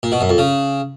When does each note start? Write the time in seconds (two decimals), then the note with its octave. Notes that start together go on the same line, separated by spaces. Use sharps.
0.03 A#2
0.12 B2
0.21 F#2
0.30 F2
0.38 C#3